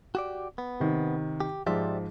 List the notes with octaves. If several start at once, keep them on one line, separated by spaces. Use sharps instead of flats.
F#4 G4 D5
B3
C3 D#3
G4
G#2 F3 G4 D5 E5